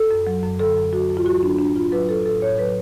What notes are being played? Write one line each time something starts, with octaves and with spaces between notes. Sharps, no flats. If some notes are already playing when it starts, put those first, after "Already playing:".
Already playing: A4
F#2
F#3
F#2
D3 A4
F#2
F#3 F#4
F#2
F4
F#3 F#4
F#3 D4
A2 D4
A2 F4
F#3 B4
F#3 A4
A2 A4
A2 C#5
F#3 B4